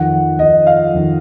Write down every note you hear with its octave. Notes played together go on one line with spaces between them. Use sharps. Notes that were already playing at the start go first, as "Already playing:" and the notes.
Already playing: F2 D#3 F#5
F2 D#3 D#5
F5
F2 D#3